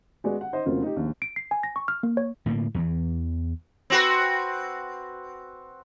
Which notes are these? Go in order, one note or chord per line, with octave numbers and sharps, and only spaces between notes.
G#3 B3 F#4 G#4 D5
F#5
D#4 C5 D#5
F1 C#3 F#3 A#3 C4 F4
D#4 G4
A#1 D#2
D7
C7
G#5
A#6
C#6
F6
A#3
C#5
A2 D3 A3 A#3
E2 E3
C4 F#4 B4